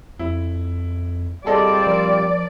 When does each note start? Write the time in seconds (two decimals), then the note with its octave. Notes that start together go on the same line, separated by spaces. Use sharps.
0.19 F2 E4
1.46 G3 C4 F4 G#4 A4 D5 D#5
1.87 F3 A#4